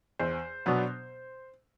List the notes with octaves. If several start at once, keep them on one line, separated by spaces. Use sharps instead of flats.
E2 C5
B2 F#3 B3 D4